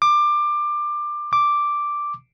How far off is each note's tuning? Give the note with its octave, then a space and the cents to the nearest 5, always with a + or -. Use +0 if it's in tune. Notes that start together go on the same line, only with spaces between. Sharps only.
D6 +20
D6 +0